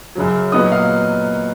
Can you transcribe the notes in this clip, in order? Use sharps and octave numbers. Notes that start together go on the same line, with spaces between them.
F#2 C#3 F#3
A#2 F#3 B3 D#4 D#6
F5